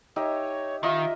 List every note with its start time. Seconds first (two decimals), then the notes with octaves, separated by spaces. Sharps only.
0.16 D#4 G4 C#5 E5
0.83 D#3 F4 D#5 E5 A#5